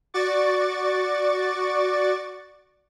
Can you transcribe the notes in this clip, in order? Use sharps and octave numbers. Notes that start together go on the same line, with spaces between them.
F#4 D5 C#6 D6 A6